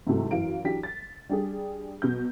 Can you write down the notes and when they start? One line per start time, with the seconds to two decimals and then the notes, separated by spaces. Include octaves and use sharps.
0.07 G#2 C3 E3 F#3 A3
0.31 F#2 E3 F5 D7
0.64 E3 F#3 D4 G4 B6
0.83 A6
1.29 G3 D4 G4 G#4
2.02 B2 F#3 G6